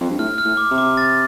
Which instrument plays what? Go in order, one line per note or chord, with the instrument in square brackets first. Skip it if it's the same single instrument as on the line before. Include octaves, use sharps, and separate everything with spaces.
[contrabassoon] F2
G2
[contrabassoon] A2 [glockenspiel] F6
[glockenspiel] F6
[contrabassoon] A2
[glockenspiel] D6
[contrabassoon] C3
[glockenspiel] D6
A6